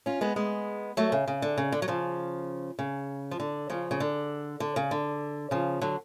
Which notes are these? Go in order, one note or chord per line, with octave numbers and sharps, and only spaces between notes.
C#4 F4
G#3 B3
G#3 B3
F#3 A3
C#3
C#3
D3
C#3
D3
F#3
C#3 F3
C#3
F3
D3
C#3 F3
C#3
D3
D3
C#3
D3
C#3 F3
D3 F#3